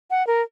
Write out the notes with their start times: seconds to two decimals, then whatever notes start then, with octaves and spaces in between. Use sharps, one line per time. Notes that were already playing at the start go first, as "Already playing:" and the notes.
0.10 F#5
0.27 A#4